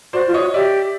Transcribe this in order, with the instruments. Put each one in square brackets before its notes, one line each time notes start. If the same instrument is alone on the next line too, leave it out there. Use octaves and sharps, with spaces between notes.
[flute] F#4 [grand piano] C5 D5
[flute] F4
[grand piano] C#5 D#5
[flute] F#4
[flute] G4 [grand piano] D5 E5